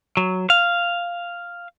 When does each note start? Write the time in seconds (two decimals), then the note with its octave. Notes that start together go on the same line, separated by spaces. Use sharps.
0.17 F#3
0.50 F5